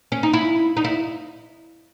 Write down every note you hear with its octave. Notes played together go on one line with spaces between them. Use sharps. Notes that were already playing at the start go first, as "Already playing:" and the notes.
C#4
D#4
E4
D#4
E4